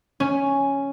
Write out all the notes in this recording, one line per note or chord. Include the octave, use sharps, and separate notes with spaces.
C#4